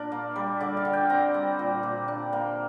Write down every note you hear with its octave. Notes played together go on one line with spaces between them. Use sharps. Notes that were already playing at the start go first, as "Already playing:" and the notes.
Already playing: A#2 D4 A#4
A#3
G3
D3 D5
F5
D3
G5
C4 A#5
G3
A#2
A#2
D4
A#3